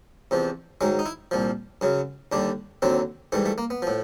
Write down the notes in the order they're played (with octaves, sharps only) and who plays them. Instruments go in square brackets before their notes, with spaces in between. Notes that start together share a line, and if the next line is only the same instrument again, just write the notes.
[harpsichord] E2 C3 F3
G#2 D#3 F#3 G#3
D#4
E4
C2 A#2 F3
F#2 C#3 F#3
D#2 D3 G3 D4
D#2 D3 F#3 C4
G#2 E3 G3 A3
A3
A#3
B3
A2 F3